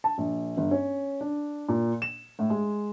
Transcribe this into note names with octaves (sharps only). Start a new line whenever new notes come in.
A5
A#1
G1
C#4
D4
A#2
E7
A2
G#3